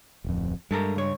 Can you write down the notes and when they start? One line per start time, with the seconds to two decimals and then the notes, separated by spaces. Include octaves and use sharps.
0.24 D1 F2
0.71 G2 G#3 A4 A#4
0.96 C#2 C#5